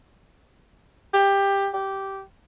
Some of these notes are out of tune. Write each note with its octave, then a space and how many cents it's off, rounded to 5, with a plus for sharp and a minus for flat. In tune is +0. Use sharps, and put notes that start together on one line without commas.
G4 +15
G4 -10